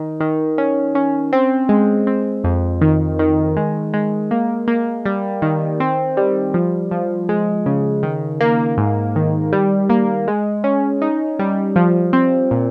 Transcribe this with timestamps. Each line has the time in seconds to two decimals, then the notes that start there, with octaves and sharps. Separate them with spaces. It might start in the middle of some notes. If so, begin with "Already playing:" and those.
Already playing: D#3
0.20 D#3
0.58 C#4
0.95 C#4
1.33 C4
1.69 G#3
2.07 C4
2.44 F2
2.81 D#3
3.19 D#3
3.57 G#3
3.93 G#3
4.31 A#3
4.68 A#3
5.05 G3
5.42 D#3
5.80 C4
6.17 G3
6.54 F3
6.91 F3
7.29 G#3
7.66 C#3
8.03 D#3
8.40 A#3
8.77 G#2
9.16 D#3
9.53 G3
9.90 A#3
10.28 G#3
10.64 C#4
11.02 D#4
11.39 G3
11.76 F3
12.13 C4
12.51 A#2